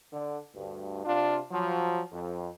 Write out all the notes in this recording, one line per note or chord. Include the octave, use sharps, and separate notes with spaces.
D3
D2 G2
C3 D4 F4
F3 F#3
F2